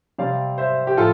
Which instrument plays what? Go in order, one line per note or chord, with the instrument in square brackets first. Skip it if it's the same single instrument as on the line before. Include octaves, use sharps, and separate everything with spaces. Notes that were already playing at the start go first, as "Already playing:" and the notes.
[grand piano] C3 G3 C4 D5 F5
C5 E5
G4
A2 F3 F4 A4